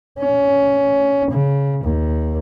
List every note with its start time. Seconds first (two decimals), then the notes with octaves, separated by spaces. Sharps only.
0.19 C#4
1.31 C#3
1.83 D#2